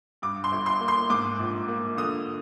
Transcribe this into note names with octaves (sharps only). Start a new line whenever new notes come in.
G2 D6
C6
G1
C6
A#3
C6
G#2 D6
A#1
A#3
D3 D#6